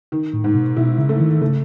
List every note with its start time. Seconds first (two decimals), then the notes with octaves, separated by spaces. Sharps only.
0.12 D#3
0.33 A2
0.44 G#2
0.55 B2
0.76 B2 E4
0.98 C#3
1.09 A3
1.20 D#3
1.42 C#3 A3